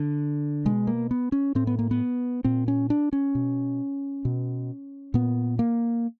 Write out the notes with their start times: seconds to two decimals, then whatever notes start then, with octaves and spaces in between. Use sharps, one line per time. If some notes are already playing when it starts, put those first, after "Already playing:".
Already playing: D3
0.65 B2 G#3
0.87 A#3
1.11 B3
1.32 C#4
1.55 A2 C4
1.67 B3
1.79 A#3
1.91 B3
2.44 A#2 C4
2.68 C#4
2.90 D4
3.13 C#4
3.35 B2
4.25 B2
5.14 A#2 B3
5.59 A#3